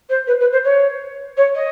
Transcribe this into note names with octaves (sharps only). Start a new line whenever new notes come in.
C5
B4
B4
C5
C#5
C#5
D#5